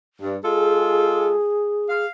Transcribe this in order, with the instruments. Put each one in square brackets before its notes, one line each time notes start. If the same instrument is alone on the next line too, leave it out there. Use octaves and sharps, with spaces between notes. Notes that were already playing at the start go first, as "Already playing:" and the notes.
[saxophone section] G2
[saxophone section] G#3 F4 A4 [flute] G#4
[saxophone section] F5